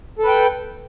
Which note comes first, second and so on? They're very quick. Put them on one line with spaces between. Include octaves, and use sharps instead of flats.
A4 B4 G5